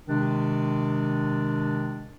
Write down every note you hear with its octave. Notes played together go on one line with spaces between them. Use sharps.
C3 D#3 G#3 D4